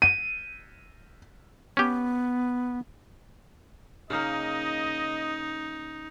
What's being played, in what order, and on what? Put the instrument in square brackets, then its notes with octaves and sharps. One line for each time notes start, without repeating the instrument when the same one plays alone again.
[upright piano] D#7
[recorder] B3 [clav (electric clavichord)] C#4 G4
[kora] C#3 A#3 [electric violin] D#4 [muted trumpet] D#5